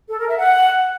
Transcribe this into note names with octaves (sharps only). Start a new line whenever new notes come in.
A4
A#4
E5
F#5